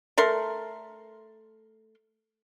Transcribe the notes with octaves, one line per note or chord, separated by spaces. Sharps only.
A3 A#4 C6